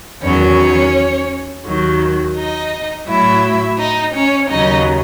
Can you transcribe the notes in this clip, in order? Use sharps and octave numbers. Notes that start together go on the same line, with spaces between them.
E2 D#3 F#3 C#4 C#5
D#2 D#3 F#3
D#4 D#5
A2 F#3 E4 E5
D#4 D#5
C#4 C#5
D#2 C#3 F#3 D#4 D#5